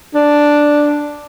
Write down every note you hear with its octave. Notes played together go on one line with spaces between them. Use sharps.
D4